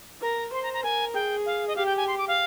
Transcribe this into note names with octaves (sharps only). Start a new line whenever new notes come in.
A#4 A#5
C5 C6
A#5
A#5
A#4 G#5
G#4 G5
F5
D#5
G4 F5
G5
G#5
C6
D6
F5